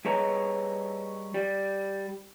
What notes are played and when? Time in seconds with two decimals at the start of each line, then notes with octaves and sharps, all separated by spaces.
0.05 G3 G#4 B4 C#5 D#5 A#5
1.34 G3